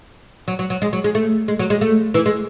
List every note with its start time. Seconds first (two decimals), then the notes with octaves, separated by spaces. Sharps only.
0.48 F#3
0.59 F#3
0.70 F#3
0.82 G#3
0.93 F#3
1.04 G#3
1.15 A3
1.48 G#3
1.59 F#3
1.70 G#3
1.81 A3
2.14 E3
2.26 G#3